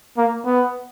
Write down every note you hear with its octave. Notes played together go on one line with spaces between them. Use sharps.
A#3
B3